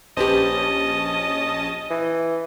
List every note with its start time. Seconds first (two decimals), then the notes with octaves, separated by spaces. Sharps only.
0.17 A#1 C#4 G4 B4 C5 D#5 A5
1.90 E3